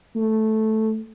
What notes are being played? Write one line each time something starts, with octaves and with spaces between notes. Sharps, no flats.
A3